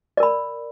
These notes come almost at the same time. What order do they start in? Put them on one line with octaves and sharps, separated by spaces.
D5 A#4 B5